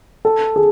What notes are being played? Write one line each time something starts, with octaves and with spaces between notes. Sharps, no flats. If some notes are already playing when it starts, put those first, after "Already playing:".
A4
G#4